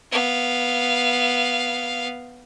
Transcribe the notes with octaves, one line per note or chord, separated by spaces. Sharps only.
B3 F5